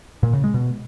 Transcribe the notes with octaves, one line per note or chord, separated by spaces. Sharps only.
A#2
C#3
G#3
B2